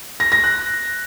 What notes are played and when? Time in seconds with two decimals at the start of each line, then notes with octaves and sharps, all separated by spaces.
0.20 A#6
0.32 A#6
0.44 F#6